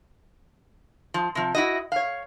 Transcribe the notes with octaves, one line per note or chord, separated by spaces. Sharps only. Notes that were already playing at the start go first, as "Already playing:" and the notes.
F3
C3 F3
E4 F#4 D#5
C#5 F5